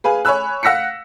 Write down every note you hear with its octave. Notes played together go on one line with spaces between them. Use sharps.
G#4 B4 F5 G#5
C#5 G#5 B5 E6 F#6
F5 F#5 E6 A#6 B6 C#7